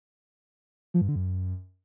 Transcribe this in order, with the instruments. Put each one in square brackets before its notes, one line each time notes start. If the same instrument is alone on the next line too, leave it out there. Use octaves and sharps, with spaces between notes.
[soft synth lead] F3
G2
D3
F#2